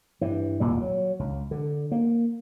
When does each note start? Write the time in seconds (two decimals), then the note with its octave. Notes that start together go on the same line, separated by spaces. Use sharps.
0.21 G2 E3
0.60 G#1 D#2 A#2 G3
0.81 F#3
1.19 C#2
1.51 D3
1.91 A#3